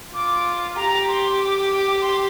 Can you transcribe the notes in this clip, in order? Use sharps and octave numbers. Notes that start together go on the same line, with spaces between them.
F4 D6
G4 A#5
C6
D6
D6
C6